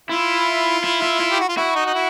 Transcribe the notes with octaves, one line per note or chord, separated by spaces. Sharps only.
E4 F4
E4
E4
E4
G4
F#4
F4
E4 F#4
D#4
D#4
E4